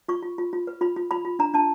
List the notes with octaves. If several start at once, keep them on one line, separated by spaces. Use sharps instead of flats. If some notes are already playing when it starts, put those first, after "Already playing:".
F4 C#6
F4
F4
F4
B4
F4 B5
F4
F4 B5
F4
D4 A#5
D4 A5